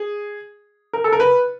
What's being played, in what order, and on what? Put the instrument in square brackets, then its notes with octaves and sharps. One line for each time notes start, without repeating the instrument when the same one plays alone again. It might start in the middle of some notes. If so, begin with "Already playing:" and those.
Already playing: [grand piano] G#4
A#4
A4
A#4
B4